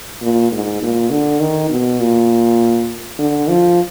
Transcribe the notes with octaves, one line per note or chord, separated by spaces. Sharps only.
A#2
G#2
A#2
D3
D#3
B2
A#2
D3
F3